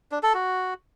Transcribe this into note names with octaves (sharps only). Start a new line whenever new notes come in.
D4
A4
F#4